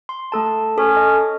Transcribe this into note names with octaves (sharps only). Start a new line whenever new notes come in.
C6
A3 A4 A5
C#4 A4
D#5